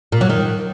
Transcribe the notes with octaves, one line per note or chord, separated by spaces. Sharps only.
A#2
F#3
D#3